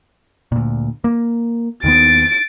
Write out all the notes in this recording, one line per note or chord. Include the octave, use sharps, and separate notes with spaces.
D2 A#2
A#3
D#2 D#3 B3 A6 D7